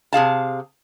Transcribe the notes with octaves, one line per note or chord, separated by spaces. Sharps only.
C3 G#4 F5 A5